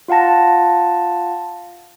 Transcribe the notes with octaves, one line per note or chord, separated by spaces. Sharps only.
F4 F5 F#5 A5 A#6